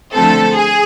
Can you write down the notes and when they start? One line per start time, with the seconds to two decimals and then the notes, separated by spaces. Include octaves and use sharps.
0.14 D3 F3 A3 C4 A4
0.55 G#4